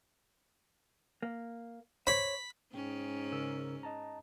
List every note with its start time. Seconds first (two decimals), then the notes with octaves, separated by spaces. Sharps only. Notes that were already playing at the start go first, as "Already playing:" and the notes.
1.22 A#3
2.07 C5 C#5 B5
2.74 G#2 C#4 G5
3.32 C#3 A#4 E6
3.83 D#5 A5 A#5